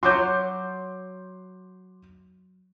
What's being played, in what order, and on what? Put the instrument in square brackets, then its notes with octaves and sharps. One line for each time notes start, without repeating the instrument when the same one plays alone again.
[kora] F#3 F#4 [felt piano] C6 D6 G6